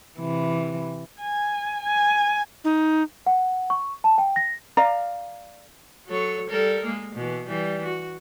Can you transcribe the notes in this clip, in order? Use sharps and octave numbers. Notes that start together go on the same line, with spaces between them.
C3 E3
G#5
G#5
D#4
F#5
C#6
A5
G5
A#6
D5 F5 A#5
F#3 A4 C#5
G3 A4 A#4
G#3 A#3
B2 E3
E3 G3
F#4